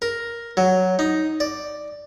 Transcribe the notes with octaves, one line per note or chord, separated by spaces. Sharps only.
A#4
F#3
D#4
D5